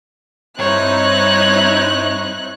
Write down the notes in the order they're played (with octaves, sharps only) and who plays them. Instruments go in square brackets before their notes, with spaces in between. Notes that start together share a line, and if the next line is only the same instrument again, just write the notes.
[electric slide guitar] G2 G3 [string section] C4 D#4 E4 [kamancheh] C#5 [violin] F#6